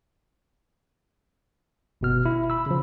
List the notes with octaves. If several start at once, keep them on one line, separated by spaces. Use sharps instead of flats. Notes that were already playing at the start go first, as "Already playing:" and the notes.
G1 B2 F6
E4
B5 E6
C#3 F3